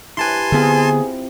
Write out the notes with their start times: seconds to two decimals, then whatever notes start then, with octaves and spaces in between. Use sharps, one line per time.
0.17 E4 G4 B4 G#5 A5 C6
0.52 D3 B3 C4 E4 F4 G#4